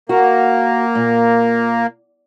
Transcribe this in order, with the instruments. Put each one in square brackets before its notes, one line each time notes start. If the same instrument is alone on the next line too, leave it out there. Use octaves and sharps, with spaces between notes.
[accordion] A#3 [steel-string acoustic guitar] F#4
[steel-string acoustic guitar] A#2